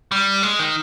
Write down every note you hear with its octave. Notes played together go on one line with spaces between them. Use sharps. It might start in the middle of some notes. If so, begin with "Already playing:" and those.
G3
G#3
D#3